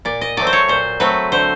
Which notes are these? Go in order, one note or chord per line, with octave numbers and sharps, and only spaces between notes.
A#2 D5
D#5
F#3 A3 C4 D5
C5
C#5
A#2 C5
F#3 A3 C4 B4
D3 C5